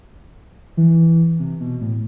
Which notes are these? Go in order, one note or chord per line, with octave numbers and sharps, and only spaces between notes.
E3
C3
B2
A2